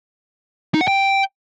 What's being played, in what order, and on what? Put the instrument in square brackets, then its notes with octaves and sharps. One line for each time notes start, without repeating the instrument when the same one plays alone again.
[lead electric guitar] D#4
F#5
G5